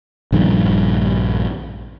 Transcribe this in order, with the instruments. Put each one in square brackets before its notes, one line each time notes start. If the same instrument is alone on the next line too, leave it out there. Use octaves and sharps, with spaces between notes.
[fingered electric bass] A#1 G2 D#3